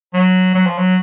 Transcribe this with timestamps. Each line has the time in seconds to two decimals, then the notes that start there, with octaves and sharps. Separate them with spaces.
0.14 F#3
0.55 F#3
0.66 F3
0.78 F#3